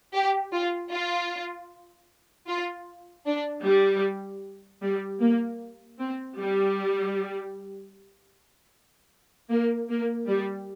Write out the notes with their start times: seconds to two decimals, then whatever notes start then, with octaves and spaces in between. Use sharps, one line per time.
0.14 G4
0.52 F4
0.92 F4
2.47 F4
3.26 D4
3.65 G3
4.82 G3
5.21 A#3
5.99 C4
6.38 G3
9.51 A#3
9.90 A#3
10.29 G3